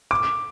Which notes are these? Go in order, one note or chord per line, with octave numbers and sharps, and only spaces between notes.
D6